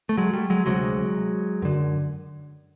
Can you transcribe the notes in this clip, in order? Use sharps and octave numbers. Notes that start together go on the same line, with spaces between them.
A3
F#3 G#3
G3 A3
F#3 G#3
D2 C3 F#3 G#3
F#2 D3